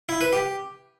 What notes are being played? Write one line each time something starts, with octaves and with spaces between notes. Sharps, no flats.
E4
B4
G4